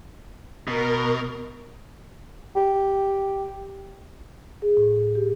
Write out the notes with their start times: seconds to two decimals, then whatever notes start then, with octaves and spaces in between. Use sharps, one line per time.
0.68 B2 A#4
2.56 G4
4.62 G#4
4.77 A2
5.15 G4